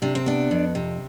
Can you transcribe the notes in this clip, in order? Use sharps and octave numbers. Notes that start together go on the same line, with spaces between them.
C3 D4
C4
B3 D4
F2
C3